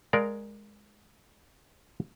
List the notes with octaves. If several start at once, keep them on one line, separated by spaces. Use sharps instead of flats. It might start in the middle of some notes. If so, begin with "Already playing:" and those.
G#3 A#4 D5 F5